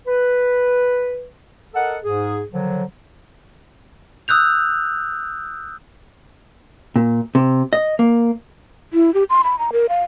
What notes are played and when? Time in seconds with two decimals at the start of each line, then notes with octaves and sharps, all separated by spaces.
0.07 B4
1.74 A4 A#4 D#5 F#5
2.03 G#2 G#4
2.51 D3 D#3 F3 F#3
4.28 D#6 E6 F#6 G6 F7
6.96 A#2
7.35 C3
7.73 D#5
7.99 A#3
8.93 E4
9.14 G4
9.30 C6
9.44 B5
9.59 A#5
9.73 A#4
9.89 F5